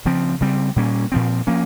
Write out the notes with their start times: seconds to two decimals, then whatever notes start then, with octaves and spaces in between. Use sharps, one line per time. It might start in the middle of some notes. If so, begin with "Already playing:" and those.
0.05 C#3 F3 C4
0.41 C#3 G3 C4
0.76 A#2 G3 A#3 C#4
1.12 A#2 F3 C4
1.47 F3 A#3 C#4